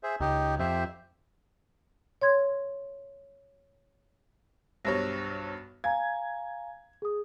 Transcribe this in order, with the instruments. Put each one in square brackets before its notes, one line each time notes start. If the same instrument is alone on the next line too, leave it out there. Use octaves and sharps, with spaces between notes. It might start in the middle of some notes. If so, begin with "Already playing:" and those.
[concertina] G#4 C5 E5
[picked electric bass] C#2 [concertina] D#4 G4
[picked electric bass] F2 [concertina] G4 C5 E5
[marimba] C#5 C6 G#6
[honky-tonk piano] B1 G2 C#5 [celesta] C5 A#6
[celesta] F5 G#5 A#5 [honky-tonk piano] G#6
[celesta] G#4 D#6